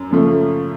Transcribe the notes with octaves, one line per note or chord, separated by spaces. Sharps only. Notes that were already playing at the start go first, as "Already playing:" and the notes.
Already playing: F#2
F#2 C#3 F3 A3